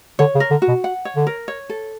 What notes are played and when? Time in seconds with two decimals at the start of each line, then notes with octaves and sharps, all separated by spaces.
0.19 D3 C#5
0.35 C#3
0.40 A#4
0.51 D3
0.62 F#4
0.68 B2
0.84 F#5
1.05 C#5
1.16 D3
1.27 A#4
1.48 C#5
1.70 A4